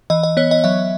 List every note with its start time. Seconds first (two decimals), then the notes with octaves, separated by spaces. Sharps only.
0.10 E3 D#5
0.23 D#5
0.37 B3 C#5
0.51 D#5
0.64 F#3 E5